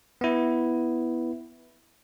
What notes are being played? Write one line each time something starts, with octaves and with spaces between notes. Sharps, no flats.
B3 E4